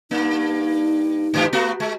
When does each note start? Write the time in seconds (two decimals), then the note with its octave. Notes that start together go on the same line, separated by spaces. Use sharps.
0.11 G2 A#3 D#4
1.34 G#2 E3 G4
1.53 A3 B3 F#4
1.80 G#3